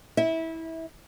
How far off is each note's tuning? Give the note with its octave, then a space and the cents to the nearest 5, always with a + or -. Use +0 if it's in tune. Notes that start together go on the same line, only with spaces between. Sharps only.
E4 -20 E5 -25